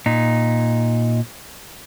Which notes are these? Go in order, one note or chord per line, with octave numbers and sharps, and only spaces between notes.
A#2 D#4